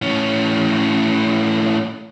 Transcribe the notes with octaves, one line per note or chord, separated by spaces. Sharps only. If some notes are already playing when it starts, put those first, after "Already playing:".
A2 C#4